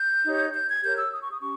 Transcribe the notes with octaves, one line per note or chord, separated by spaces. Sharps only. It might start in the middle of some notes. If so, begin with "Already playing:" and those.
Already playing: G6
D#4 G4 C#5
G6
G#6
G4 A#4 C#5 G6
E6
D#6
C#6
D#6
C#4 G4 C#6